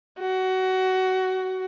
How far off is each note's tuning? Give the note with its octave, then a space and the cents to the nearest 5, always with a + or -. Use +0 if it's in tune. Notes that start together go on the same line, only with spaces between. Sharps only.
F#4 +20